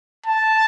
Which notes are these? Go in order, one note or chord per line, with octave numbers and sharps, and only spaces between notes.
A5